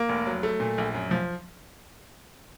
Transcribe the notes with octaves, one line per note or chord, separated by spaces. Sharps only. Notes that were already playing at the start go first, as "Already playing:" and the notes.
Already playing: A#3
F1
F#3
A3
A#2
A#1
F#2
F3